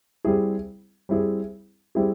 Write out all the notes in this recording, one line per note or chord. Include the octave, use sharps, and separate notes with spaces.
G3 C4 E4 G#4
G3 C4 E4 G#4
G3 C4 E4 G#4